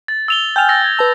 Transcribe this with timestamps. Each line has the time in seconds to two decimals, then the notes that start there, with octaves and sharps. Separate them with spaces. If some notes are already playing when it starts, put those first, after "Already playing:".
0.08 A6
0.28 E6 F7 G7
0.56 G5 G#5 F6 G6 F7
0.69 E6 A6 A#6
0.84 G#6
0.97 B4 A5 E6